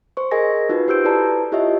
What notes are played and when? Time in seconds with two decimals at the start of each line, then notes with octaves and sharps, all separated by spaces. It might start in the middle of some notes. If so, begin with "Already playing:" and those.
0.17 C5 C#6
0.31 G#4 A#4 D#5 G#5 A#6
0.69 D#4 F4 F#4 B4
0.88 G4 C5 E6 G6 D7
1.05 E4 A4 B4 D5 A5 A#5
1.52 E4 F4 G4 C#5 D#5 E5